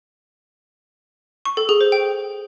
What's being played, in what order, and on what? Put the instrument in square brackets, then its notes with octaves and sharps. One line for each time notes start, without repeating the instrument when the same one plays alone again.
[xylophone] C#6
A4
G#4
C5
G5